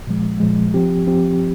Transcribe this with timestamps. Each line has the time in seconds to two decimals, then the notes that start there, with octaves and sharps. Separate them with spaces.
0.07 A#2 F3 G#3
0.40 A#2 F3 G#3
0.74 F3 C4 G4
1.06 F3 C4 G4